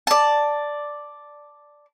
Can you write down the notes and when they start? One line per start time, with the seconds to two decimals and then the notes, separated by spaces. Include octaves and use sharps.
0.07 D5 A5